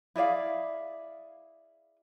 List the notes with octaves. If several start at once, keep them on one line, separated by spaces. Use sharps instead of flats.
E4 G#4 D5 F5